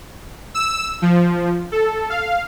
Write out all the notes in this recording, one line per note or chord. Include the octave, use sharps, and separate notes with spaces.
E6
F3
A4
F5